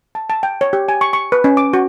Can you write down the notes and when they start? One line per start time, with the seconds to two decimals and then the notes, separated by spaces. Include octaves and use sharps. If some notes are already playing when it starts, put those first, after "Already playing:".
0.15 A5
0.30 A5
0.43 G5
0.61 C#5
0.73 G4
0.89 G#5
1.01 C#6
1.13 C#6
1.32 B4
1.44 C#4
1.57 D6
1.73 F#4